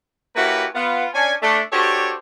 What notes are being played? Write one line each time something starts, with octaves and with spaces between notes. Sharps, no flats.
A#3 C#4 E4 F#4 G4 B4
B3 F4
C#4 D4 G#5
A3 D4
D4 F#4 G4 A4 C5 C#5